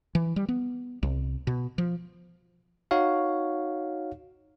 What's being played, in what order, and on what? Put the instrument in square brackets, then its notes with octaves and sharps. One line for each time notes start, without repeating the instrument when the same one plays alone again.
[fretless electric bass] E3
G3
B3
C2
B2
F3
[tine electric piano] D#4 F#4 C#5 F5